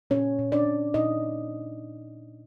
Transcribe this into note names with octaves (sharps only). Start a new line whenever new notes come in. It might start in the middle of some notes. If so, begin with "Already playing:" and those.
A#2 C#4 C#5
A#2
D4 D5
A#2
A#2 D#4 D#5